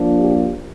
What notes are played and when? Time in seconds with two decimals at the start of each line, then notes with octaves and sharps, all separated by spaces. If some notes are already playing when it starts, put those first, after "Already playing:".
Already playing: F3 A#3 D4
0.19 G4